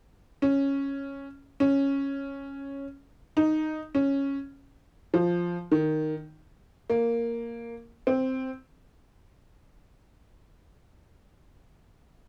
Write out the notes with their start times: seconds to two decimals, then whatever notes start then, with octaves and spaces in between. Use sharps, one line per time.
0.42 C#4
1.60 C#4
3.37 D#4
3.95 C#4
5.14 F3
5.71 D#3
6.90 A#3
8.07 C4